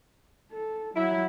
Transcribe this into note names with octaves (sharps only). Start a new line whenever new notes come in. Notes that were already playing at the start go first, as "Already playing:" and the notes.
A4
F#3 E4